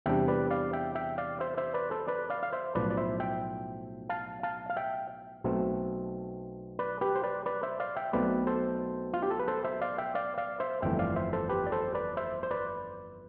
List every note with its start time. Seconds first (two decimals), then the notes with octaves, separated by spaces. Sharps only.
0.06 E2 C3 G3 D4 E5 G5
0.28 B4 D5
0.50 D5 F5
0.73 E5 G5
0.95 E5 G5
1.18 D5 F5
1.40 C5 E5
1.57 C5 E5
1.74 B4 D5
1.91 A4 C5
2.08 B4 D5
2.30 D5 F5
2.43 F5
2.53 C5 E5
2.75 B1 A2 F3 B4 D5
2.90 D5
2.97 C5 E5
3.20 E5 G5
4.09 F5 A5
4.43 F5 A5
4.70 F5
4.77 E5 G5
5.44 B1 B2 A3 C4
6.79 B4 D5
7.01 G4 B4
7.15 C5
7.23 B4 D5
7.46 B4 D5
7.63 C5 E5
7.80 D5 F5
7.96 E5 G5
8.13 B1 B2 A3 C4 B4 D5
8.47 A4 C5
9.14 F4
9.23 G4
9.31 A4
9.40 B4
9.48 A4 C5
9.64 C5 E5
9.81 D5 F5
9.98 E5 G5
10.15 D5 F5
10.38 D5 F5
10.60 C5 E5
10.82 G1 F2 E3 A3 E5 G5
10.99 D5 F5
11.16 C5 E5
11.33 A4 C5
11.49 G4 B4
11.67 D5
11.72 A4 C5
11.94 B4 D5
12.17 C5 E5
12.43 C5
12.51 B4 D5